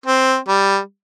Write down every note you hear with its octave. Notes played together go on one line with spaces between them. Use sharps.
C4
G3